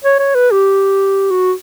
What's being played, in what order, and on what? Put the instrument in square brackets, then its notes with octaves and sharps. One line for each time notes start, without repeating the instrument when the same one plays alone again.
[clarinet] C#5
C#5
B4
G4
F#4